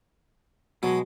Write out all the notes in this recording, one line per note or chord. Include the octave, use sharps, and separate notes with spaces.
B2 F#3 G#3